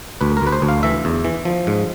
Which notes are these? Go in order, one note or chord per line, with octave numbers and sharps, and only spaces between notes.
D2 B4
A#4
D2 B4
C5
D2
F5
E3 E5
E2
E3
F3
G#2